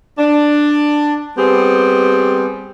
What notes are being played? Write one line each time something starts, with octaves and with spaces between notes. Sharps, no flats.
D4
G3 B3 C4 G4 G#4